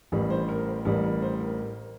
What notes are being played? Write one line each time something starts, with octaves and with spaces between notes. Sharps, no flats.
A1 A2 G3 A#4
C5
A#4
C5
A1 A2 G3 A#4
A#4
C5
A#4